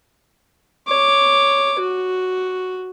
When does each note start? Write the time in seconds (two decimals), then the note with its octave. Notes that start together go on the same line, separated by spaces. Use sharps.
0.88 C#5 D6
1.79 F#4